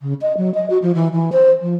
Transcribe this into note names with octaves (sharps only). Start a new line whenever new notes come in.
C#3
D#5
F#3
D#5
F#4
F3
E3
E3
C5
F3